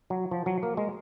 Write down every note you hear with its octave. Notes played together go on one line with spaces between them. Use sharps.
F#3
F3
F#3
A#3
G#3